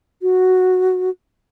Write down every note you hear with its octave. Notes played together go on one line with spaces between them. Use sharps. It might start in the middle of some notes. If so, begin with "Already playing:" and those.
F#4